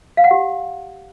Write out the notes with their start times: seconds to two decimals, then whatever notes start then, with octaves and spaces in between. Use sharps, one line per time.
0.17 F5
0.24 F#5
0.31 G4